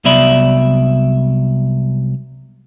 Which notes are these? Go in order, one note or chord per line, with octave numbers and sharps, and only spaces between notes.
C2 F#3 B3 D5 E5 B5